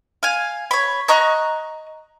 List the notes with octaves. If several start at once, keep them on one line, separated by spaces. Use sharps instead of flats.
F5 G#5
C#5 B5
D#5 A#5 C#6 F#6